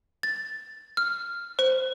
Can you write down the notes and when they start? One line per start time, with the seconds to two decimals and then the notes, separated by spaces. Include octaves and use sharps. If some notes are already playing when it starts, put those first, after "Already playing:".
0.23 A6
0.97 F6
1.59 C5